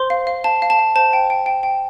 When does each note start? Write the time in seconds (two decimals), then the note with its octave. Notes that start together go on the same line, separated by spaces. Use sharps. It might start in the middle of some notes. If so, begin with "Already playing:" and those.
Already playing: C5 C6
0.10 F5
0.27 F5
0.44 F5 A5
0.62 F5
0.70 A5
0.79 F5
0.95 C5 A5
1.13 G5
1.30 G5
1.46 G5
1.63 G5